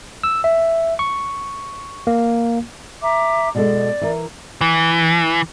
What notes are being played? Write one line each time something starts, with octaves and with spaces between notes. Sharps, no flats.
E6
E5
C#6
A#3
E5 A#5 D6
B2 G#3 A4 D5
E3 A#4
E3